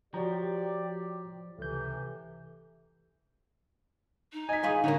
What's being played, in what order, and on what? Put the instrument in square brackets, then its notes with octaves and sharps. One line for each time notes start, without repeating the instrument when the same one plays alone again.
[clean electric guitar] F3 [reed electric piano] F#4 C#5 A#5 [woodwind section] G4 D5
[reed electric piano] C#2 G6 [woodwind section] A2 C3 E3
[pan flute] D#4
[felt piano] D#5 B6 [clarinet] G#5
[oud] E3 F4 G#4
[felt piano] D3 [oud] A#3 F#4 [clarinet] D#4 [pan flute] C#5